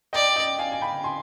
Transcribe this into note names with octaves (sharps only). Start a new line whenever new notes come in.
D5 D#5 G5
D#5 G5
F5 G#5
G#5
G5 B5
G#5 C6